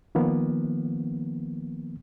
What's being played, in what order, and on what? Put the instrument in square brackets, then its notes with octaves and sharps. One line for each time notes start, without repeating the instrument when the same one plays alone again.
[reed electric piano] D#3 F3 A#3 B3